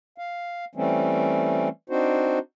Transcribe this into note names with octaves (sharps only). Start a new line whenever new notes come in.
F5
E3 G3 A3 C4 C#4
C4 D4 D#4 F#4 C5